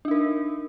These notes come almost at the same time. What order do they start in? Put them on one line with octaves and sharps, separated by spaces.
D4 D#4 A#4